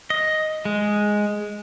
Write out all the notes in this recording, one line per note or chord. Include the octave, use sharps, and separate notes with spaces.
D#5
G#3